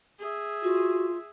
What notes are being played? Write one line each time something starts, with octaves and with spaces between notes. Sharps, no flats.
G#4 E5
F4 F#4